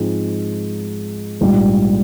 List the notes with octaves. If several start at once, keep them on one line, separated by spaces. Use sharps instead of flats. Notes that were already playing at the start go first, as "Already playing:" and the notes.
Already playing: G#2 F3 G#3 C4 D#4
A#1 G#2 G3